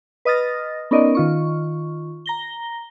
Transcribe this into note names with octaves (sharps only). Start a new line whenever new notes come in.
B4 D#5 D#6 F6 A6 A#6
B3 C#4 D#4 A#4 D5 D#5
D#3 F4 C#6
A#5 A#6 G7